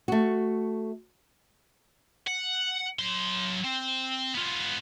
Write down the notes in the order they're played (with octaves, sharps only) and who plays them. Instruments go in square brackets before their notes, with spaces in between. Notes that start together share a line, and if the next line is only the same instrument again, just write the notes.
[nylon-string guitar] A3 F#4
[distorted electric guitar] F#5
F#3 C6
C4
B3 F4